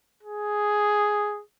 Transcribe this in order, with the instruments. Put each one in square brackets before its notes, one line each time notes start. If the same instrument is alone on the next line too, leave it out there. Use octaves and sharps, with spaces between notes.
[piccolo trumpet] G#4